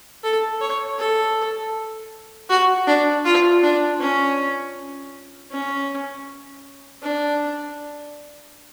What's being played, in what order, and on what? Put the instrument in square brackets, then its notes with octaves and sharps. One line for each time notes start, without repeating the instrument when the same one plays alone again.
[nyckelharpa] A4
C#5
A4
F#4
D4
F4
D4
C#4
C#4
D4